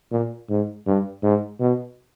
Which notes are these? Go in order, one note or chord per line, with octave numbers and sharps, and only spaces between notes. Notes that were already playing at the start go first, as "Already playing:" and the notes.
A#2
G#2
G2
G#2
B2